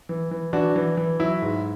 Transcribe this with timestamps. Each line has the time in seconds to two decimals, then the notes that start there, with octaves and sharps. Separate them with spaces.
0.09 E3
0.31 E3
0.53 E3 D4 F#4
0.76 E3
0.97 E3
1.20 F#3 E4
1.42 G#2